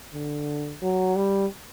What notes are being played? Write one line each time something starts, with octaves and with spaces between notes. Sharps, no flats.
D3
F#3
G3